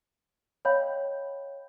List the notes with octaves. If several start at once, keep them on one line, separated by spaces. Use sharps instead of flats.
C#5 D#5 F5 G5 B5 G6